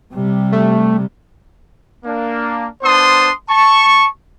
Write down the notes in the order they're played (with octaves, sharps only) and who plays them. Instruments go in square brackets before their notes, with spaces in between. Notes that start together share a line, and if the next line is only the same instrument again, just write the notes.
[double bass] C3 G3
[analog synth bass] A3
[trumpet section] A#3 D4
B3 D4 C5 A5 C6 D#6
A5 C#6